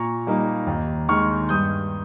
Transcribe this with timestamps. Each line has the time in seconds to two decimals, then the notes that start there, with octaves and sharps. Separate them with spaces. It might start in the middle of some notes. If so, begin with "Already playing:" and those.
Already playing: A#2 A#5 C#6
0.27 G3 A#3 D#4
0.67 D#2
1.09 D#3 G#3 C#6 F6
1.49 G2 D#6 G6